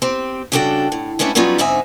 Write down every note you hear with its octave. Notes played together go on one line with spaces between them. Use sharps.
C4 G4
C#3 G3 D4 F#4 A4 G5
A2
G#3 A3 B3 C#4 D4 E4
F#3 G3 B3 C#4 D#4 F4
G#2 D3 C4 D#4 E5 G#5